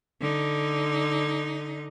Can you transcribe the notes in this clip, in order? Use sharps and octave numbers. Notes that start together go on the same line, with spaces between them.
D3 D#4